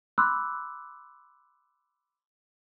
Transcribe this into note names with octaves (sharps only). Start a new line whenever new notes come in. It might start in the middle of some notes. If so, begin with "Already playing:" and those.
B5 C6 D6 E6 F#6